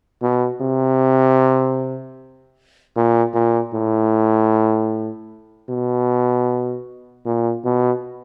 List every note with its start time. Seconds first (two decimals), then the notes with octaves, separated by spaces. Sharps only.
0.22 B2
0.61 C3
2.96 A#2
3.34 A#2
3.73 A2
5.69 B2
7.26 A#2
7.65 B2